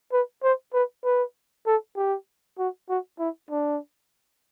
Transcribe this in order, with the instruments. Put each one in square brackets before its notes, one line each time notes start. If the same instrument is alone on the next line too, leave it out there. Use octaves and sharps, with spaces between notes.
[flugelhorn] B4
C5
B4
B4
A4
G4
F#4
F#4
E4
D4